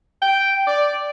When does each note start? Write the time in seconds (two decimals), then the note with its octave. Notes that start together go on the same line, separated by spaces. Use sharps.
0.22 G5
0.67 D5